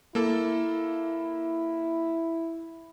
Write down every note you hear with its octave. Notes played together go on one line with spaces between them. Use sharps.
A#3 E4 A4